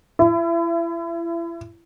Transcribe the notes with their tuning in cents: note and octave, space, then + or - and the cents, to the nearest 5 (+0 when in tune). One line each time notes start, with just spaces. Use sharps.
E4 +35